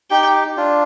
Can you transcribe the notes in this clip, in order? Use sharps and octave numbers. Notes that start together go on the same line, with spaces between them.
D#4 G4 G5
D4 F4